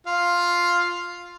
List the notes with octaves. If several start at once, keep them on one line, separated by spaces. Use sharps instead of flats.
F4 F5